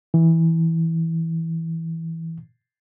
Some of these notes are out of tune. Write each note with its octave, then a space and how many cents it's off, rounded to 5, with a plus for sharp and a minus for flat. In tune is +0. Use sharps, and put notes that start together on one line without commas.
E3 -10